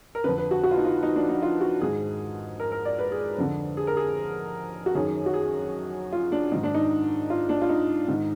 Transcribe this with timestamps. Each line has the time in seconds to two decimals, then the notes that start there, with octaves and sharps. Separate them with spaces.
0.15 A#4
0.24 F2 D3 B4
0.38 B4
0.51 F#4
0.63 F#4
0.71 F4
0.77 D#4
0.85 F4
1.03 D#4
1.16 D4
1.29 D#4
1.42 F4
1.61 F#4
1.81 G#2 D#3 G#4
2.60 A#4
2.72 A#4
2.85 D5
2.99 B4
3.12 G#4
3.38 F2 D3
3.77 G#4
3.87 A#4
3.97 G#4
4.86 F#4
4.94 F#2 D#3 G#4
5.26 F#4
5.34 G#4
6.12 F4
6.32 D4
6.51 G#2 D#3 D#4
6.63 D4
6.75 D#4
7.30 F4
7.49 D4
7.62 F4
7.69 D#4
8.08 G#2 D#3